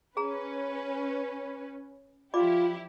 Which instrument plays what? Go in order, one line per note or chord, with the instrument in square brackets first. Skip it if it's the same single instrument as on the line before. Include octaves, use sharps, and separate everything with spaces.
[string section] C#4 B4 [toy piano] G#4 A#5
[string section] F3 E4 G4 [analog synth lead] F4 [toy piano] D5 B5 D6